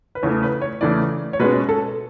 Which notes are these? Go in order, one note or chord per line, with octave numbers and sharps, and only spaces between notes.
B4
E2 C#3 E3 A3 C#5
B4
C#5
E2 C#3 E3 A3 D5
C#5
B2 G#3 C#4 B4
A4